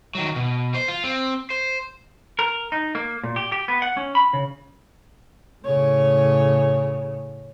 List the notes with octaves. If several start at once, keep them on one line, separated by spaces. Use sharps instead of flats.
D#3 F#3
B2
C5
F4
C4
C5
A#4
D#4
A#3
A#2
G4
G4
B3
F#5
C#4
B5
C#3
A2 C#3 C#5